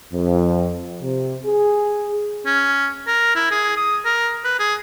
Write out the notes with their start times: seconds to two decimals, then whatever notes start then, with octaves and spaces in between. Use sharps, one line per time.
0.13 F2
1.02 C3
1.45 G#4
2.46 C#4
3.07 A#4
3.36 E4
3.51 G#4
3.77 D#6
4.05 A#4
4.44 B4
4.59 G#4